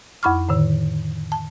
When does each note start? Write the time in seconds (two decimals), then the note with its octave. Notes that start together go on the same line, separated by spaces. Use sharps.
0.23 F2 E4 B5 C#6 F6
0.49 A2 D3 D#3
1.32 A5